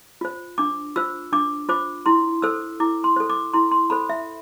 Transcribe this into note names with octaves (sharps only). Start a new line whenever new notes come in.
F4 C5
D4 D6
F4 C5 E6
D4 D6
F4 C5 D6
E4 C6
A4 C5 E6
E4 D6
C6
A4 C5
D6
E4 C6
C6
A4 C5 B5
E5